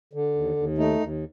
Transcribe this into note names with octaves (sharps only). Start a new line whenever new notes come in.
D3
D#2
D#2
A3 D#4
D#2